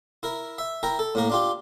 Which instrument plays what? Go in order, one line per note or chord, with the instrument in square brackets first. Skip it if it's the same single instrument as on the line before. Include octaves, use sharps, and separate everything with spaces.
[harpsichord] E4 A#4
E5
E4 A#4 G5 A#5
A4
A2 A#3 A#4
D4 F4 G4